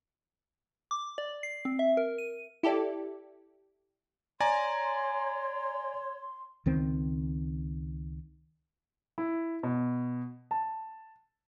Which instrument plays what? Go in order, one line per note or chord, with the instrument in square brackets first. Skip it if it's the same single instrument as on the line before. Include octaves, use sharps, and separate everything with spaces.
[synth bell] D6
D5
C7
C4
E5
A#4
D#7
[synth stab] E4 G4 A4 D5
[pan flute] C#5 [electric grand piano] D5 G#5 A#5 [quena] C6
[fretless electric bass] C#2 D#3 C4
[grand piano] E4
B2
A5